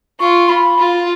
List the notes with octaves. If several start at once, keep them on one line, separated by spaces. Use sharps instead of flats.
F4 C#6
B5
F4